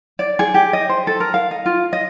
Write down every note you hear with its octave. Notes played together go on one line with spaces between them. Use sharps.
D5
G#4
G4
D#5
C5
A4
A#4
F5
D#5
F4
D#5